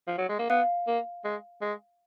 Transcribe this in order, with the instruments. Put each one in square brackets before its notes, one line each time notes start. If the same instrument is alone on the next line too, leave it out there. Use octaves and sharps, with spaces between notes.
[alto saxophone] F3
F#3
G#3
A#3
[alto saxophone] B3 [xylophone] F5
[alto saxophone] A#3
G#3
G#3